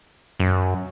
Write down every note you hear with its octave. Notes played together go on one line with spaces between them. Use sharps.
F#2